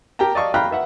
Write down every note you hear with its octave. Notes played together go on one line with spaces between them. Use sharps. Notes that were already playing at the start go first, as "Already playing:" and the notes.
G4 A#4 G5 A5 A#5
D5 D#5 F5 A5 C#6 D#6
F5 G5 A#5 B5 F6 F#6
B4 E5 F#5